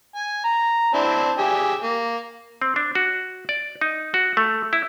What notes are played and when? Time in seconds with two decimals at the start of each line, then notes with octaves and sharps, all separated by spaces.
0.16 G#5
0.44 A#5
0.94 C4 D4 E4
1.39 G4 G#4 E5
1.83 A#3
2.62 C4
2.76 D4
2.95 F#4
3.49 D5
3.81 D#4
4.14 F#4
4.37 A3
4.73 E4